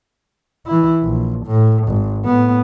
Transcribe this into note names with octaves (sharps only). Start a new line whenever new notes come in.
E3 E4
A#1
A2
G#1
A2 B3